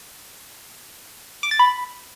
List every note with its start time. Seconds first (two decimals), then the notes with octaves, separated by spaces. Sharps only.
1.43 D6
1.51 A6
1.59 B5